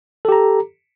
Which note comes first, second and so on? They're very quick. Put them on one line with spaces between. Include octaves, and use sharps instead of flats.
A4 G4 A#5